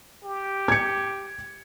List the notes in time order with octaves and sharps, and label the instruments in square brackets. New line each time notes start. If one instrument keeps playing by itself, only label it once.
[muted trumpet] G4
[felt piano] G#6 C#7